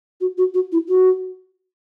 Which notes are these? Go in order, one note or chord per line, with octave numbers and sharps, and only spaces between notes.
F#4
F#4
F#4
E4
F#4